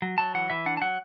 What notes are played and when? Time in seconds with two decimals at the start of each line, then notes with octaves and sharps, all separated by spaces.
0.02 F#3
0.18 F#3 A5
0.34 E3 F#5
0.50 E3 E5
0.66 D4 F#5
0.77 A5
0.82 F#3 F#5